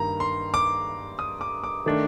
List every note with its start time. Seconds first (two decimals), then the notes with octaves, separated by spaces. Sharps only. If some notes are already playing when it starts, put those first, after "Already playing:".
Already playing: G2 D#3 A#3 A#5
0.20 C6
0.54 D6
1.19 D#6
1.41 D6
1.64 D6
1.86 D#3 A3 D4